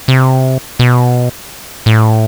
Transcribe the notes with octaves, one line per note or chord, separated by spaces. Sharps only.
C3
B2
A2